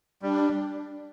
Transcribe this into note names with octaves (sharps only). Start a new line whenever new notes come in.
G3 D4